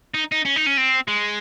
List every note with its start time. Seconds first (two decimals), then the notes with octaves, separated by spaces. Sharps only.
0.14 D#4
0.32 D#4
0.45 C#4
0.56 D#4
0.66 C#4
0.77 C4
1.08 G#3